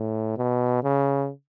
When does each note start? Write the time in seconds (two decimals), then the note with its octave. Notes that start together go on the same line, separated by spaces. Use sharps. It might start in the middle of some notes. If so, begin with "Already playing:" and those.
Already playing: A2
0.37 B2
0.83 C#3